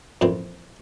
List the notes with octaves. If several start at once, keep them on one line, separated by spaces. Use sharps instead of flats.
F2 A#2 E3 C4